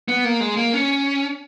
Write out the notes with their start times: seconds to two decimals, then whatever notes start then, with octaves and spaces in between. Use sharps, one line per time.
0.08 B3
0.24 A#3
0.40 G#3
0.57 A#3
0.74 C#4